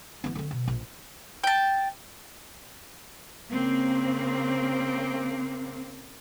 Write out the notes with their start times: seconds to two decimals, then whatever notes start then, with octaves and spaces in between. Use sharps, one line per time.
0.24 E3 B3
0.35 D3 C4
0.51 B2
0.68 A#1
1.44 G5 A5
3.50 C#3 A#3 C4